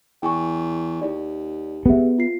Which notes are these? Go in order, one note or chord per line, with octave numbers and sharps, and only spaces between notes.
E2 G5 G#5 C#6
D#2 D5
B3 G4 G#4 E5
F4 C7